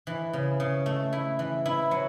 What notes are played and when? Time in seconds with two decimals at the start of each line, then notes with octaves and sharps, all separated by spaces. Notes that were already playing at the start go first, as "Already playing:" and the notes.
0.07 E3
0.33 C#3
0.60 C#3
0.86 A3
1.13 E4
1.39 E3
1.66 E4
1.91 F#3